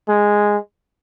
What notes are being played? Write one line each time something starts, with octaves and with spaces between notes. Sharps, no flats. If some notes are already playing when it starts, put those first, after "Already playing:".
G#3